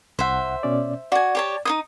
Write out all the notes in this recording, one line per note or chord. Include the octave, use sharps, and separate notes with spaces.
C2 C5 E5 F#5
B2 C#4 D5
F#4 D5 G#5
G4 C#5 A5
D#4 C#5 D#6